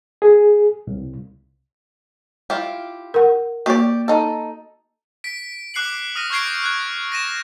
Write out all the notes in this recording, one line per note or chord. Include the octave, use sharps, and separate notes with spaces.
G#4
C2
E4 F4 G4
A#4 F#5
A#3 F#4 G4 D5 C#6
D#4 A4
B6 D7
D6 F#6 C7 C#7 F#7
D#6 F6 A#6 D#7
C#6 F6 G6 G#6 C7 D7
F#6 G#6
A#6 D#7 E7